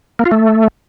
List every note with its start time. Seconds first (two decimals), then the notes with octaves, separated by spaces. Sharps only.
0.19 A#3
0.25 F4
0.32 A3